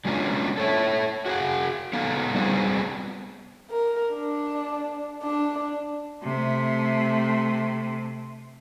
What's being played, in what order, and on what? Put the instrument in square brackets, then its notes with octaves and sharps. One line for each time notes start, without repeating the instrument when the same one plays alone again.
[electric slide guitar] F#3 G#3 B3 C#4 D4 F4
A4 C#5 E5
F#4 G#4 F#5
B3 D#4 A4 F5
G3 B3 C4 F4 G#4
[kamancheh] A#4
D4
D4
[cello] C3 A3